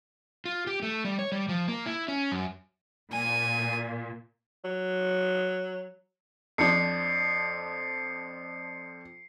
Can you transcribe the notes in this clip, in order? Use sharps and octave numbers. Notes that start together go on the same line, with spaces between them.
F4
G4
A3
G3
C#5
G3
F3
A#3
E4
C#4
F#2
A#2 G#5
F#3
F2 F3 D4 C7 C#7